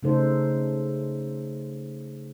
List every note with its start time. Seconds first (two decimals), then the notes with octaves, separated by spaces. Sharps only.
0.03 C#3 A3 D#4 A4 C5